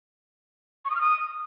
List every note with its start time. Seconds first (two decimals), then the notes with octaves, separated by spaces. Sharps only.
0.85 C#6
0.90 D#6
0.96 F6
1.01 D#6